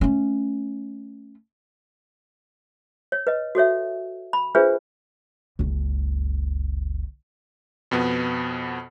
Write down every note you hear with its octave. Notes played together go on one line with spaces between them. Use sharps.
A3 C#4
C#5
B4 D#5
F#4 A4 C#5 E5
B5
D4 F4 G#4 B4 C5 E5
F#1 C#2
F2 B2 B3